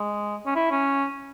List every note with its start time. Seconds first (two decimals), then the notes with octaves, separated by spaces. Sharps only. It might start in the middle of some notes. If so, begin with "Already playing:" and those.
Already playing: G#3
0.46 C#4
0.55 E4
0.71 C#4